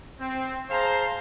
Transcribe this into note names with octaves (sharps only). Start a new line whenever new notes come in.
C4
G#4 C5 F5 A5 A#5